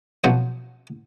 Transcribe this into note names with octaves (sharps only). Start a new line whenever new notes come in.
B2 F3 F#3 F#4 C5 C#5